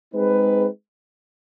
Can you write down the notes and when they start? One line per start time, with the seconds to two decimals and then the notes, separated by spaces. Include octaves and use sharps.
0.14 G#3 C4 D#4 G#4 B4